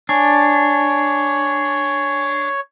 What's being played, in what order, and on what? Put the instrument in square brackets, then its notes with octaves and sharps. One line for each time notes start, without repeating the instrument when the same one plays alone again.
[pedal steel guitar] D4 [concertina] C#5 [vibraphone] G#5